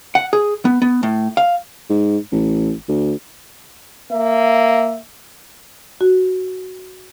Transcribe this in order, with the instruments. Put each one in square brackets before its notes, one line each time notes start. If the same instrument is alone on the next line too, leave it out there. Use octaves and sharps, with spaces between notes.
[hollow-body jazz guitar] F#5
G#4
B3
B3
A2
F5
[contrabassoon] G#2
A1
D2
[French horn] A#3 [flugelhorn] E5
[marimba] F#4